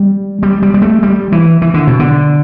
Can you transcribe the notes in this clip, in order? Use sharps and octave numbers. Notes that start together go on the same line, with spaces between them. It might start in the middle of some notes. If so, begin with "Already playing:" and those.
Already playing: G3
G3
G3
G3
A3
G3
E3
E3
D3
B2
D3